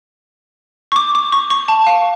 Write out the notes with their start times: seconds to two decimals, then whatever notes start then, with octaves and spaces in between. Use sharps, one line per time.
0.92 C#6
0.96 D6
1.15 D6
1.32 C#6
1.50 C#6
1.68 A5
1.87 F5